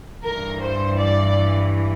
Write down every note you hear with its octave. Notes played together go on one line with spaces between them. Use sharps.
G2 E3 A#4
C5
D5